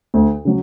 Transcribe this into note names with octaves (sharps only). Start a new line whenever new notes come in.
D2
C#3 F#3